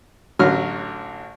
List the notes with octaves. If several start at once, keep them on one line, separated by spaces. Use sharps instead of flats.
A1 D3 F#3 F6